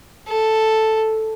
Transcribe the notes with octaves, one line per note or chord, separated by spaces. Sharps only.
A4